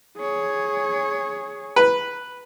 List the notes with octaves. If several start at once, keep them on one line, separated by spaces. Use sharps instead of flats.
G#4 C#5
B4